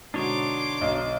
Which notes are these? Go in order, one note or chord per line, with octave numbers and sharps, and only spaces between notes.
G#2 B2 D3 D4 D#4 C#5 C6 D6
B1